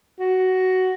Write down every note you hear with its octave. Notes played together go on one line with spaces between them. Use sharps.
F#4